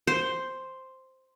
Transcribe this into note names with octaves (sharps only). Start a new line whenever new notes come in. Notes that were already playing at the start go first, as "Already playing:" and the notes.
C5